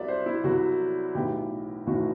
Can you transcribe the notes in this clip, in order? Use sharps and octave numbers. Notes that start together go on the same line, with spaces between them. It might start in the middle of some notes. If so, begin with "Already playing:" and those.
Already playing: C2 C3 F#3 D5 E5
C5
E4
C2 C3 F#3 F#4
B1 A2 E3 G4
B1 A2 E3 F#4